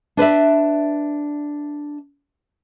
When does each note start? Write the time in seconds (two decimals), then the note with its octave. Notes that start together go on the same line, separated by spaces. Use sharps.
0.17 D4 B4 D5 E5